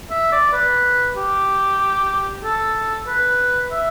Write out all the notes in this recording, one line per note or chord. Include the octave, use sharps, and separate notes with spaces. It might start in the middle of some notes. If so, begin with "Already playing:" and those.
E5
D5
B4
G4
A4
B4
E5